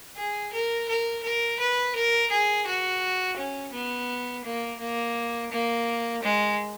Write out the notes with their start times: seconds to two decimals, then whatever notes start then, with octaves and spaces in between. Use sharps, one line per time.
0.16 G#4
0.53 A#4
0.88 A#4
1.23 A#4
1.59 B4
1.95 A#4
2.31 G#4
2.67 F#4
3.37 C#4
3.73 B3
4.44 A#3
4.79 A#3
5.51 A#3
6.23 G#3